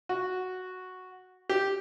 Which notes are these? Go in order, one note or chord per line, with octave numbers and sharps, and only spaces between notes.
F#4
G4